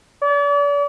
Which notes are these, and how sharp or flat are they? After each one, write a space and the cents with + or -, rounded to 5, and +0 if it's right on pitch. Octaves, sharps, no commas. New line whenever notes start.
D5 -40